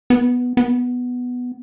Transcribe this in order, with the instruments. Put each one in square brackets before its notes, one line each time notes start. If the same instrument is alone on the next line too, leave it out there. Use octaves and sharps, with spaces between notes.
[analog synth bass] B3
B3